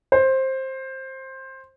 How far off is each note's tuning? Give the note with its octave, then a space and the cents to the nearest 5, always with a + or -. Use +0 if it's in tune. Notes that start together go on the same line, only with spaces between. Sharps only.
C5 +15